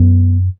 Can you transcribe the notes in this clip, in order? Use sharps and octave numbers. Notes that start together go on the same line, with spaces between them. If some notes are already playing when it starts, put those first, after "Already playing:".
Already playing: F#2 B3